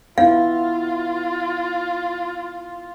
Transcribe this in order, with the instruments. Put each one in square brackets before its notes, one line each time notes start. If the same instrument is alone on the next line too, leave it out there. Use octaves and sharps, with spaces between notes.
[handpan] B3 E4 [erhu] F4 [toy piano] F5